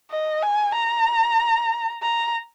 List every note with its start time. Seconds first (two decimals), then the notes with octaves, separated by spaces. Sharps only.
0.11 D#5
0.43 G#5
0.75 A#5
2.02 A#5